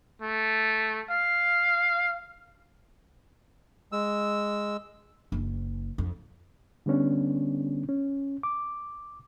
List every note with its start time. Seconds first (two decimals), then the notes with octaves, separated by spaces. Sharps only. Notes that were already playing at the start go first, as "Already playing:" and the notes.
0.22 A3
1.10 F5
3.92 G#3 E6
5.32 F#1
5.98 F2
6.86 D3 G3 B3 C#4 D4
7.89 C#4
8.43 D6